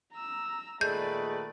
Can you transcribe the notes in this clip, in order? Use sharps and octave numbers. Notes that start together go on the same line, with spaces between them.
A#5 E6
A#2 D#3 G#3 A3 B4 D5 G6